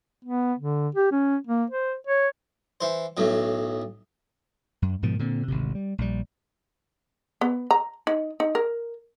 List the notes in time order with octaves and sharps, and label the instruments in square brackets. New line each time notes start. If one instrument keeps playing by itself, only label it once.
[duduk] B3
D3
G4
C#4
A#3
C5
C#5
[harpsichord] E3 C5
B1 A2 F#3
[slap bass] F#2
G#2 B2 D#3 F3
A#2 D3 C4
G#1 D2 C3
G3
A#1 G3
[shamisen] B3
A#5
D#4
D#4
A#4